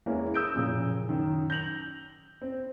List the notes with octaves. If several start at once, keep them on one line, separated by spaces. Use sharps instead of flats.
E2 E3 G#3 A#3 C#4
D#6 E6 G6 D7
F#1 F2 A#2 C#3
F#2 D#3
G6 A#6 F7 F#7
C4